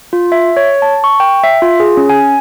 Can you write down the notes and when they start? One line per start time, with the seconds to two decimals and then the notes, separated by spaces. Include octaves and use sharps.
0.13 F4
0.32 E5
0.57 C#5
0.82 A5
1.04 C#6
1.20 G5
1.44 E5
1.62 F4
1.80 G#4
1.97 C#4
2.10 G#5